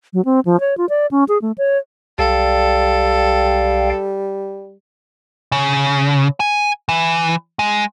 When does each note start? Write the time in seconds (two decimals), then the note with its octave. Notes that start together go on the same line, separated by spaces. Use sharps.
0.13 F#3
0.25 C4
0.45 F3
0.60 C#5
0.78 F4
0.89 D5
1.11 C#4
1.28 G#4
1.42 A3
1.58 C#5
2.19 B1 G3 A4 D5 F5 G5
5.52 C#3
6.40 G#5
6.89 E3
7.59 G#3